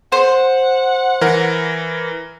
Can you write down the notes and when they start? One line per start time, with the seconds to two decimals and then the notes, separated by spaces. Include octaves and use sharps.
0.12 C5 F#5
1.21 E3 A#4